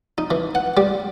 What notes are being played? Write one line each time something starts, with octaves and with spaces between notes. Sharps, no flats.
D#4
E3
F#5
G3